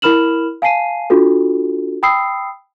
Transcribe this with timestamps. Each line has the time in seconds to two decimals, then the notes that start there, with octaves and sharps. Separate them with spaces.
0.02 E4 A#4 B5 F6 E7 F#7
0.62 F5 G#5 A5 C7 D#7
1.10 D4 F4 F#4 A4
2.03 G5 B5 D#6 E6 C7